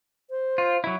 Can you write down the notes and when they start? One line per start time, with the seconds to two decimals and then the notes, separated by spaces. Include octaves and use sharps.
0.30 C5
0.58 F4
0.84 F#3 E4